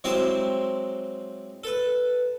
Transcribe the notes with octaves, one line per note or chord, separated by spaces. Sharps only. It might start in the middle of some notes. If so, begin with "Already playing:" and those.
F#3 G#3 C4 E4 G4 C5
A4 B4